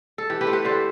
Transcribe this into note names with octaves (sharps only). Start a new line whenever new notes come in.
A4
E3 G4
G4 B4
A3 C4
G4 B4
D3 A4 C5